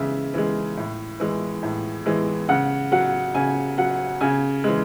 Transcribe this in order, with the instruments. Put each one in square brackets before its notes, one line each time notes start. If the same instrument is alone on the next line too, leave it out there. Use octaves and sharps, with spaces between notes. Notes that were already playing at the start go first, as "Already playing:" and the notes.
Already playing: [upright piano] C#3 E3 G#3 E5
E3 G#3
A2
E3 G#3
A2
E3 G#3
C#3 F#5
F#3 F#5
C#3 G#5
F#3 F#5
C#3 G#5
E3 G#3